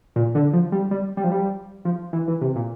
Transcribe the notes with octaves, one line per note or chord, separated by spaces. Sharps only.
A#2
D3
F3
G3
G3
G3
F3
G3
F3
E3
E3
C3
A#2